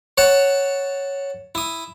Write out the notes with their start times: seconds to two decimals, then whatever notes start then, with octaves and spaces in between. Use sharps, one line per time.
0.18 C#5 F#5 A5
1.55 E4 D#6